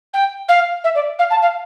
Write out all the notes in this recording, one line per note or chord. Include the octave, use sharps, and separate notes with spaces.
G5
F5
E5
D5
F5
A5
F5